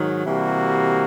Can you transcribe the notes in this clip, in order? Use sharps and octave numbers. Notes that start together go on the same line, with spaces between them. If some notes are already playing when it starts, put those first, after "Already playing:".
Already playing: G#2 D#3 F#3
C3 E3 G3 A#3 F#4